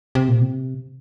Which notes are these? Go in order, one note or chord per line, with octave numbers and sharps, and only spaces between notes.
C3
A#2
C3